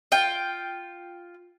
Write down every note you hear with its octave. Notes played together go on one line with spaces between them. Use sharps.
F4 G5